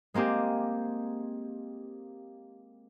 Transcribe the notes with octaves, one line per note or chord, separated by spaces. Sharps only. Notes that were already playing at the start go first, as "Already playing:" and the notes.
G#3 A#3 C4 G4 G#4